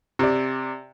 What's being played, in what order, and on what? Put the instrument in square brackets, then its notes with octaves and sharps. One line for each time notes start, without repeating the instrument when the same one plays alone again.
[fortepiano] C3 D5